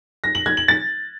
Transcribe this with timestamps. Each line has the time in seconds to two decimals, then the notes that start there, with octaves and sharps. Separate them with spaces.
0.24 A#6
0.35 F#7
0.46 G#6
0.57 F#7
0.68 A6